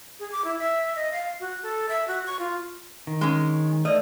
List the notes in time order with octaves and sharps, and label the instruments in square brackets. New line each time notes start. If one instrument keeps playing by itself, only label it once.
[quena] G#4
D6
E4
E5
D#5
F5
F#4
A4
E5
F#4
C#6
F4
[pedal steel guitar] D#3
[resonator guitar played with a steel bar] G#3 C#4
[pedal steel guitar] A3 [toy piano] B4 D5 [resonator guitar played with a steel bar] D#5